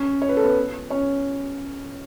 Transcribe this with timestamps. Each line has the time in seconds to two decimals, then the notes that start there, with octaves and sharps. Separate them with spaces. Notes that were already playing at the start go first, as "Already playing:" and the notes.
Already playing: C#4
0.22 C#5
0.29 B4
0.37 A4
0.44 B3 B4
0.90 C#4 C#5